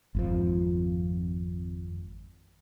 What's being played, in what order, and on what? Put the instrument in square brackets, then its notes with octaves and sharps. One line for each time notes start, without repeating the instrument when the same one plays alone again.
[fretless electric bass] G#1 F2 F3